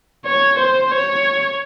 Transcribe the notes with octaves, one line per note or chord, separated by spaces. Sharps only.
C#5
C5
C#5